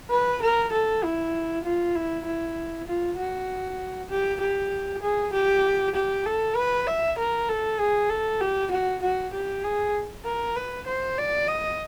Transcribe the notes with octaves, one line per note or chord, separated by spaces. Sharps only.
B4
A#4
A4
E4
F4
E4
E4
F4
F#4
G4
G4
G#4
G4
G4
A4
B4
E5
A#4
A4
G#4
A4
G4
F#4
F#4
G4
G#4
A#4
B4
C5
D5
D#5